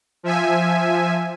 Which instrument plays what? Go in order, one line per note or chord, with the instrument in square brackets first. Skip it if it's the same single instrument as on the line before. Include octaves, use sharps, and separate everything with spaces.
[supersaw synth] F3 E5 G#5